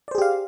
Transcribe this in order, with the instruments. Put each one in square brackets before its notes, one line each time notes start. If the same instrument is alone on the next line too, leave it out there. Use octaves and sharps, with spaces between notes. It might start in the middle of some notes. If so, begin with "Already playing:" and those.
[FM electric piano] D5
C5
G#4
G4
F5